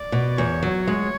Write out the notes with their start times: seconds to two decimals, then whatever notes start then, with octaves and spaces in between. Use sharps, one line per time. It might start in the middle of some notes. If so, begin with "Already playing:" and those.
Already playing: D5
0.12 B2
0.38 E2 C#5
0.63 F#3
0.86 G#3 C#5